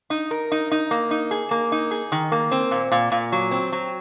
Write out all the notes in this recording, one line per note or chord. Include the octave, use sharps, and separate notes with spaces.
D#4
A#4
D#4
D#4
A#3
D#4
G#4
A#3
D#4
G#4
D#3
A#3
C4
A#2
A#2
A#2
F#3
C4
F#3